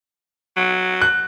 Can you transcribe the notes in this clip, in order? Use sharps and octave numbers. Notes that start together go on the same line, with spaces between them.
F#3
F#6